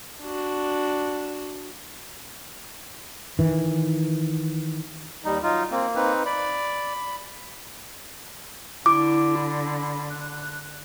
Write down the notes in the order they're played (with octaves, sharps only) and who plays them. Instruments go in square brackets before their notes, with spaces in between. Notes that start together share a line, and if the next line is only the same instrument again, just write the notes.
[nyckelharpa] D4 F#4
[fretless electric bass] D#3 E3
[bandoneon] D#2 G3 [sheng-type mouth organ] D#4
[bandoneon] F#3 [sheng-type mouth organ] D#4 F4
[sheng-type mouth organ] A#3 [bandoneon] C4
[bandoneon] C4 D#4 B4
[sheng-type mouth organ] D5 [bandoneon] B5
[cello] D3 [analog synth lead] E4 [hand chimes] D6
[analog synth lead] B5
F#6